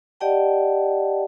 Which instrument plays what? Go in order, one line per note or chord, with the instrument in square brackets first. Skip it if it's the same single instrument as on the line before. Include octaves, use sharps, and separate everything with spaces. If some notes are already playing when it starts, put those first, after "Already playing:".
[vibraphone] G4 D5 D#5 F#5 G5 A5